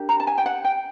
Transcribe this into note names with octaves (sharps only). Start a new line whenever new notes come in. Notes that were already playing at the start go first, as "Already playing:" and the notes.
Already playing: D4 G4 A#4
A#5
A5
G#5
G5
F#5
G5